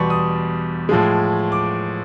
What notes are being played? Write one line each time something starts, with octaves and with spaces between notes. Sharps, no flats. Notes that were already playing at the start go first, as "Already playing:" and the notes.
Already playing: E2 B2 G3 C6 C#6
D#6
A2 F3 G#3
D6